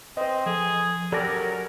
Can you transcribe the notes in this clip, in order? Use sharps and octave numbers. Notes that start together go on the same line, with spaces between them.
C4 B4 C5 D#5
F3 G#4 A4
F#3 C#4 G4 A4 A#4 D5 B5